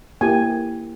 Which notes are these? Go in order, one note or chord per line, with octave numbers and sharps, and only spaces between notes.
A#3 E4 G4 G#5